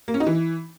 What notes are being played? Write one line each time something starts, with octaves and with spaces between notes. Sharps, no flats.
A#3
C#4
D#4
E3